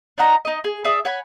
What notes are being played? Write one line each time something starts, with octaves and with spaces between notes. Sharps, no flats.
D4 D#4 F#5 A#5
D#4 D#5
G#4
G#4 D5 E5 D#6
C#5 F#5 G#5 B5